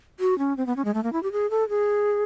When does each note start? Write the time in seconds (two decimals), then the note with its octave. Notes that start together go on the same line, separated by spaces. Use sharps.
0.20 F#4
0.39 C#4
0.57 C4
0.67 B3
0.76 C#4
0.85 G#3
0.94 A3
1.04 A#3
1.13 E4
1.23 G4
1.32 G#4
1.50 A4
1.69 G#4